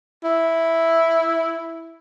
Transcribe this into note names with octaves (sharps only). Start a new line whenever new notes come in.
E4